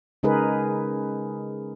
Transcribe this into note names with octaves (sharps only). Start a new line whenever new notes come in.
C#3 G#3 D#4 G#4 A#4 B4